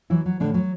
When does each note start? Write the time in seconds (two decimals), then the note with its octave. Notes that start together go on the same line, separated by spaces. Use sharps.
0.10 E3 F#3 E4
0.26 F#3
0.40 A2 D3 D4
0.54 F#3